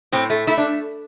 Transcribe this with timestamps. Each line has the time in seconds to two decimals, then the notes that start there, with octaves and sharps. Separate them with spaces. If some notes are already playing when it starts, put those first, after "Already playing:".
0.12 A2 C4
0.30 A3
0.47 A3 E4
0.58 D4